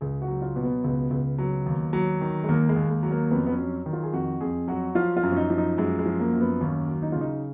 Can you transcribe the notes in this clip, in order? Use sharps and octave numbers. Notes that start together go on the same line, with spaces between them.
C#2 G#4
F#4
F#3
F4
B2
B3
C#2
C#2
F#3
D#2
F#3
D#3
G#3
D#2 A#3
G#3
D#2
G#3
F#3
A#3
F2 B3
B3
C#4
F#3
D#3
F4
G#4
F2 F#4
F2 G#4
F#3 F#4
F3 F4
F4
F#2
C#4
D#4
F3
D#4
F#2 G#3
G#3
F3
A#3
F#2
B3
D#2 C#4
F#3
D#4
C#3 F4
D#4